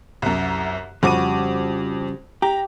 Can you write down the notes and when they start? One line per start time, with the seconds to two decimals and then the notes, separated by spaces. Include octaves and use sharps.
0.22 C2 F#2
1.03 F2 C#3 G3 F#4 D6 D#7
2.42 G4 A#5